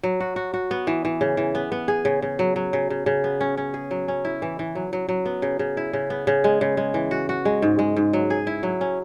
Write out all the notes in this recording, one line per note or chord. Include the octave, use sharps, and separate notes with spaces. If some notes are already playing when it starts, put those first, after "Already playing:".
F#3
F#4
F#4
F#4
B3
E3
E3
C#3
E3
B3
B3
G#4
C#3
C#3
F#3
F#3
C#3
C#3
C#3
B3
C#4
C#4
G#4
F#3
C#4
E4
E3
E3
F#3
F#3
F#3
B3
C#3
C#3
E4
C#3
B3
C#3
G#3
C#3
G#3
E3
F#4
F#4
G#3
G#2
G#3
G#2
F#3
G#4
E4
F#3
C#4